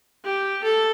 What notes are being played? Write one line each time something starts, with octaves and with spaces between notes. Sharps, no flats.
G4
A4